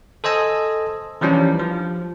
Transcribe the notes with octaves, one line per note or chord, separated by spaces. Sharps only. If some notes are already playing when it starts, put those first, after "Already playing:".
A4 C5 D#5 G#5 E6
E3 F3 G3 C#4 D4
F3